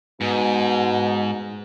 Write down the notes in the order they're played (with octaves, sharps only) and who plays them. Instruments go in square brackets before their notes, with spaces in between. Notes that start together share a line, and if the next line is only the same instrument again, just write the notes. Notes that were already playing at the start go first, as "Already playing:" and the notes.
[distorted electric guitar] G#2 [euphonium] B2